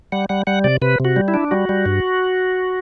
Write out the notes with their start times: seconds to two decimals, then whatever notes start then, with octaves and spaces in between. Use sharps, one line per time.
0.12 G3 F#5
0.29 G3 F#5
0.47 G3 F#5
0.64 C3 D5
0.82 C3 B4
1.00 C3 F#4
1.16 G3
1.28 E4
1.34 D4
1.51 G3 F#4
1.69 G3
1.86 G2